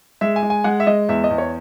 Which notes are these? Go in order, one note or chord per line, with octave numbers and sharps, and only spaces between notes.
G#3 E5
G#5
G#3
G#5
G#3 F#5
E5
G#3 D#5
E2 E5
D#5
E2
C#5